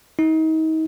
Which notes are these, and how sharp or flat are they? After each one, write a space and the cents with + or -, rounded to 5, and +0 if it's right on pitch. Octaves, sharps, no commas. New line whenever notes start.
D#4 +35